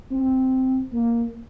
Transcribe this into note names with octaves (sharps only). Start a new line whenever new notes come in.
C4
A#3